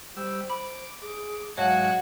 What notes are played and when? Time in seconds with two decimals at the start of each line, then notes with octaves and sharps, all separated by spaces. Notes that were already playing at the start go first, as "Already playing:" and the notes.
0.17 G3 C5 E6
0.50 B5 D6
1.02 G#4 D6
1.57 G#2 F#3 F#4 C#5 D#5 F5 G#5 A5